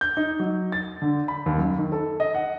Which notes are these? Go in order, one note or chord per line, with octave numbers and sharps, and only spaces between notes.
G6
D#4
F#3
A6
D3
B5
D#2
F#2
D#3
A4
D#5
F#5